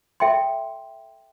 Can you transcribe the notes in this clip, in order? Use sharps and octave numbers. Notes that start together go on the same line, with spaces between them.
A4 E5 G5 C6